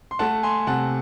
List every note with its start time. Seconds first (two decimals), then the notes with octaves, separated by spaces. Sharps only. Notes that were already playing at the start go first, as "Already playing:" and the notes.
0.11 C6
0.19 A3 F#5 A5
0.43 G#5 C6
0.67 C3 F#5 A5